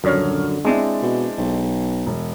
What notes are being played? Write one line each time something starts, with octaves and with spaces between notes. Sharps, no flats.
D#1 F#2 D3 C#5 F6
G#3 C4 D4 E4
B2
B1
E1